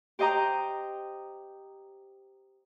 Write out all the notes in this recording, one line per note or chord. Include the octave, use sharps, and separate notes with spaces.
G4 C5 D#5 G5 A#5